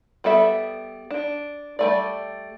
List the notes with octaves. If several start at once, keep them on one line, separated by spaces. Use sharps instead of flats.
G3 B3 A4 E5
D4
G3 A3 D5